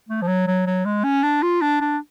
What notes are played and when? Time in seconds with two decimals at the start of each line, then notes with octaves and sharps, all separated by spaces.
0.09 A3
0.22 F3
0.28 F#3
0.47 F#3
0.66 F#3
0.86 G#3
1.04 C#4
1.24 D4
1.43 F4
1.62 D4
1.81 D4